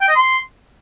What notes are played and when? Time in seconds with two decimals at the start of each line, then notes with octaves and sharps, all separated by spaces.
0.01 G5
0.09 D#5
0.16 C6